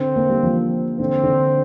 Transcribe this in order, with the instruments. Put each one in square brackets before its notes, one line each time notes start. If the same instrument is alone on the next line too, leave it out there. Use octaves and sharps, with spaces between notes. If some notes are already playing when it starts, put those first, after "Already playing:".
Already playing: [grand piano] D3 [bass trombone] C4
[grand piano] A#3
G3
F3
[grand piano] D3 [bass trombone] C4
[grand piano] D3